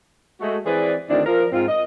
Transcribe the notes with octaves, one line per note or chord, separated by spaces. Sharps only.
G#3 A3 F#4
E3 C4 G#4 B4 D5
D2 D#3 C4 D4 E4 D5
F3 A#4
G#2 C4 F4
D#5